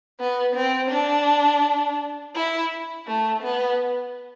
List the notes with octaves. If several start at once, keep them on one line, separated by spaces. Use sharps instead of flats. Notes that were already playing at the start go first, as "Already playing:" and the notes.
B3
C4
D4
E4
A3
B3